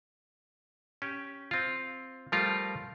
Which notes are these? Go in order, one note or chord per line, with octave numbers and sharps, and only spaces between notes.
C#4 G4
C4 F4
F3 G3 A3 F4 G4 A#4